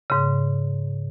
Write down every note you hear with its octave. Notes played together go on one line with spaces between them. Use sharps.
G#2 C#3